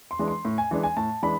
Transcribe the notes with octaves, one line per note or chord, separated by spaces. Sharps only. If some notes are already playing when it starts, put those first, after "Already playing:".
C6
E3 G#3 D4
C6
A2
G#5
E3 G#3 D4
G#5
A2 A5
E3 G#3 D4 B5